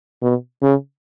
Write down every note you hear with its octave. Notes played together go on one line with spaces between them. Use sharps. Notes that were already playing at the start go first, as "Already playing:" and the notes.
B2
C#3